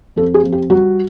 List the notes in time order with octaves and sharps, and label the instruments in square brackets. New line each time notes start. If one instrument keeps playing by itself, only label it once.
[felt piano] F2 A4
G#4
F2
G4
G3 F#4